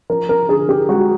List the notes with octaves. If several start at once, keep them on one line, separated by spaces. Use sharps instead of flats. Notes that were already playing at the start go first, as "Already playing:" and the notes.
F3 A#4
A#4
D3 G#4
G4
G#3 F#4